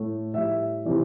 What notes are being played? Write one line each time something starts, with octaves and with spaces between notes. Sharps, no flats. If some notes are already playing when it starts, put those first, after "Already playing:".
Already playing: A2 A3
A2 G3 E5
C3 E3 G3